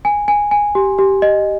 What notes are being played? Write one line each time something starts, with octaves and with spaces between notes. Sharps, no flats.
G#5
G#5
G#5
G4
G4
D#5